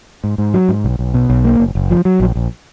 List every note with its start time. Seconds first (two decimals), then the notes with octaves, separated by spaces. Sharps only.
0.24 G#2
0.38 G#2
0.54 F#3
0.69 G#2
0.84 B1
0.99 B1
1.14 B2
1.30 B1
1.45 A#3
1.60 F#1
1.75 F#1
1.91 F3
2.05 F#3
2.20 A#1
2.36 A#1